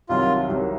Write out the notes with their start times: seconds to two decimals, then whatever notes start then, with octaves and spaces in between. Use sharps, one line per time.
0.09 C2 C3 D#3 F#3 F4
0.49 C2 C3 D#3 F#3